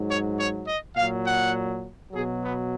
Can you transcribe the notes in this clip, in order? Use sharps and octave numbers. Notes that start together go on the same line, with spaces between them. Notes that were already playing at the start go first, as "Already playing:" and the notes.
Already playing: G#2 F#3
C#5
C#5
D#5
A#2 F#3 F5
F#5
B2 F#3 G#4
B3